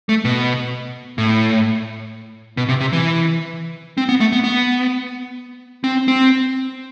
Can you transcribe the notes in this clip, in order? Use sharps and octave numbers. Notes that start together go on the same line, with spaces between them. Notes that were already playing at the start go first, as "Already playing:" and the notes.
A3
B2
A2
B2
C3
C3
E3
C4
B3
A3
B3
B3
C4
C4